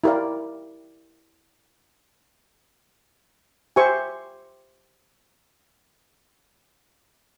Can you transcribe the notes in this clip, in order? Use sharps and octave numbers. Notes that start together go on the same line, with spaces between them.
E4 G4 A#4 D5 F5
G4 C5 E5 G#5 C#6